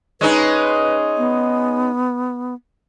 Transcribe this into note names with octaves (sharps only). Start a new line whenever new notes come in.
G#3 C#4 D#4 B4
B3